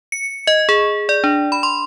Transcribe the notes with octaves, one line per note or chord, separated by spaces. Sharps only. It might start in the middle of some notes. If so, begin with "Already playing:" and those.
C#7
D#5
G#4
D5
D4
B5
C6